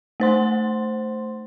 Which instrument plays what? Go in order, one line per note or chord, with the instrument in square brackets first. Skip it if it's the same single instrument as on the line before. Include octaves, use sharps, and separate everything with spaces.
[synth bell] A3 C5 C6